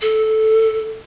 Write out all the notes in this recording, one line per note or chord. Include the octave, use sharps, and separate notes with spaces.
A4